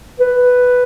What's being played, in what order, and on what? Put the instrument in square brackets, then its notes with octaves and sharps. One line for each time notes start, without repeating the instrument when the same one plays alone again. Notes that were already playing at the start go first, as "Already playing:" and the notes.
[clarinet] B4